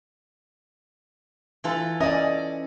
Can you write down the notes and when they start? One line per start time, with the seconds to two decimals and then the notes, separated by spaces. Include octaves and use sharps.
1.64 E3 F4 A4
2.00 C#4 D5 D#5